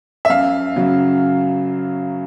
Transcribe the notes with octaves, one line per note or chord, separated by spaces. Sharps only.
E5
F#2 F5
C#3 F#3